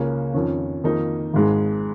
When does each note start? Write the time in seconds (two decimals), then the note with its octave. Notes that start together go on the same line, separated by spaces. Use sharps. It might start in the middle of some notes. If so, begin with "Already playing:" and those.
Already playing: C#2 C#3 A#3 C#4
0.34 F2 D#3 C#4
0.84 F2 D#3 A#3 D#4
1.34 G#1 G#2 G#3